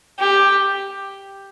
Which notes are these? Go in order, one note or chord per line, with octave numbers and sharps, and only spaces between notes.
G4